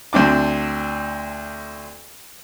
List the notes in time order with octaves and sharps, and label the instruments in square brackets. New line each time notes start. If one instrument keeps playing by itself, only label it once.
[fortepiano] D2 C4 D4 D6